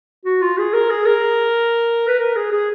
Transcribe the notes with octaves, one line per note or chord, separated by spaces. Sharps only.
F#4
F4
G#4
A#4
G#4
A#4
B4
A#4
G#4
G#4